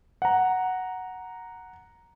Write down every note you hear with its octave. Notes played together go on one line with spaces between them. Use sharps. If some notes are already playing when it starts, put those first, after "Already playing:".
F#5 A#5